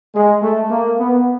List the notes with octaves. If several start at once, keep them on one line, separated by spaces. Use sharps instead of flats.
G#3
A3
A#3
B3